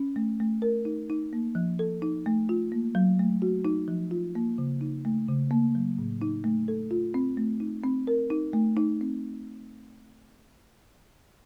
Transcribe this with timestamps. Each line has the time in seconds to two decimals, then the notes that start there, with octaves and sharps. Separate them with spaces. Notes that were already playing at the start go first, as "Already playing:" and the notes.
Already playing: C#4
0.16 A3
0.40 A3
0.62 A#4
0.85 D#4
1.10 D#4
1.33 A#3
1.55 F3
1.79 A4
2.02 D#4
2.26 A3
2.49 F4
2.72 A#3
2.95 F#3
3.19 A3
3.42 F#4
3.65 D#4
3.88 F3
4.11 F4
4.35 A#3
4.58 C#3
4.81 D#4
5.05 A3
5.28 C#3
5.51 A#3
5.75 F#3
5.99 A2
6.22 D#4
6.44 A3
6.68 A4
6.91 F4
7.14 C4
7.37 A3
7.60 D#4
7.84 C4
8.07 A#4
8.30 D#4
8.53 A3
8.77 D#4
9.01 C4